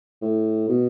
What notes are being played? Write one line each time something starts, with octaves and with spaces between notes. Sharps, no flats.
A2
B2